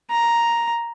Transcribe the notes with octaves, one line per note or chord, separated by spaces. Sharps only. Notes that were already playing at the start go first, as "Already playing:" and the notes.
A#5